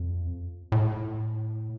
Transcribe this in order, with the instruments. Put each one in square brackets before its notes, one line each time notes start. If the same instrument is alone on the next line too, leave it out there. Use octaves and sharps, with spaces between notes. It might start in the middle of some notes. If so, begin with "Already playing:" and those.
Already playing: [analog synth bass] F2
A2